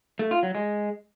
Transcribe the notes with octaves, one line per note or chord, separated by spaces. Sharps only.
A3
F4
F#3
G#3